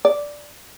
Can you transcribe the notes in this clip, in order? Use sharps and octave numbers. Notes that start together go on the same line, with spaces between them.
D5